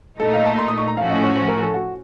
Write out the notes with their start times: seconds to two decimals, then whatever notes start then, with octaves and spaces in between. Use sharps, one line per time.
0.20 A#2 A3 D#4 A4
0.33 F5
0.46 A5
0.58 C6
0.68 D#6
0.78 C#6
0.88 A#5
0.97 A2 F3 A3 C#4 F#4 F5
1.10 D#5
1.23 C#5
1.36 C5
1.48 A#4
1.61 A4
1.74 F#4